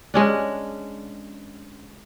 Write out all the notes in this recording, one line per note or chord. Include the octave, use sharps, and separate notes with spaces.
G#3 C#4 D4